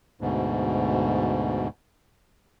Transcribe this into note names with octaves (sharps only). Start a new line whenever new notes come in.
D2 G#2 B2